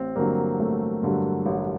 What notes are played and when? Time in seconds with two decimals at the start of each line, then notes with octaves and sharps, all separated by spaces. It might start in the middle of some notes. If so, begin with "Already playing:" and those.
Already playing: A1 C4
0.16 G2 D3 F#3 A#3
0.59 A1 A3
1.03 G2 D3 F#3
1.46 A1